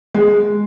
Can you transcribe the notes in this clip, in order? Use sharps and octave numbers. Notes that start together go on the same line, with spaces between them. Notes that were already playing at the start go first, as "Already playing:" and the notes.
G#3